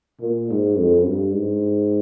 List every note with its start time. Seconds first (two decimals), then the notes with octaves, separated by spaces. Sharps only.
0.21 A#2
0.50 G#2
0.78 F2
1.06 G2
1.34 G#2